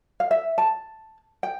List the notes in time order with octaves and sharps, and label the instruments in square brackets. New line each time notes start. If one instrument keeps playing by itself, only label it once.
[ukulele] F5
E5
A5
G5